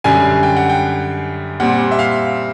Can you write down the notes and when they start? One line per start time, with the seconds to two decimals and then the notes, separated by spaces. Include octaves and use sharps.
0.04 F#2 D3 G3 G#5
0.43 G5
0.56 F#5
0.70 G5
1.60 A#2 G3 C4 F#5
1.92 E5
1.99 F5